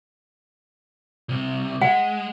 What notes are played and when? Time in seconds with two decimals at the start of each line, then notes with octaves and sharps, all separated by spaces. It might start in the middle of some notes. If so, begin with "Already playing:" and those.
1.29 C2 C3
1.82 G#3 F#5